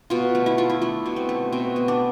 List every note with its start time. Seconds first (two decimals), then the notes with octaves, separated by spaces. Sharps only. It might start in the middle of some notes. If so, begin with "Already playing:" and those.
0.10 B2 F4
0.35 A3
0.46 E4
0.58 A3 F4
0.70 E4
0.82 A3 D4
1.06 B2
1.16 C4
1.29 A3
1.52 B2 C4
1.76 B3
1.88 D4